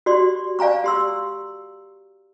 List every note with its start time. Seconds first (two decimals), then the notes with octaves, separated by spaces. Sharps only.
0.06 F#4 G4 D5 C6
0.59 D5 F5 G#5 A#5 C#6
0.84 G4 C6 E6